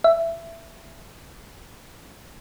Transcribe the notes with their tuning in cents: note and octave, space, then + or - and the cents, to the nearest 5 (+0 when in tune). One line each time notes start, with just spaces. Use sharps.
E5 +10